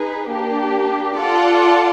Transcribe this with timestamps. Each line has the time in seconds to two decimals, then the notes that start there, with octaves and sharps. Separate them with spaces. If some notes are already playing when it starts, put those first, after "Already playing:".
Already playing: D#4 G#4 B4
0.30 A#3 D4 G4
1.17 F4 A4 D5 F#5 A5